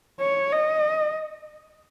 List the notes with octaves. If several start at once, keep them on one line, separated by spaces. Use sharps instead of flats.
C#5
D#5